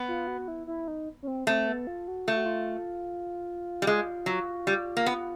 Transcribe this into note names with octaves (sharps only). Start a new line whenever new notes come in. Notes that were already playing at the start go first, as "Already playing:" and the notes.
Already playing: B3
F4
F#4
E4
E4
D#4
C#4
C4
A3 C4
B3
F4
F#4
A3 F4
F#4
F4
G3
G#3
F#3
G3
A#3
B3